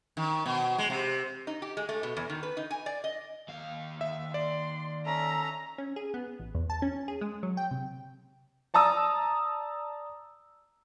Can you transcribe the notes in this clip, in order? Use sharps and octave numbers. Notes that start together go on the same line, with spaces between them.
D#3
B2
G#3
C3
D#4
G4
G#3
A3
B2
E2
D#3
B4
D#4
G#5
D5
D#5
D#2 F5
E5
D5 C6
C#4 A4 E5 A#5
C#4
G#4
B3
A1
E2
A5
C#4
G#4
G#3
F#3
G5
C3
D5 A5 A#5 D#6 E6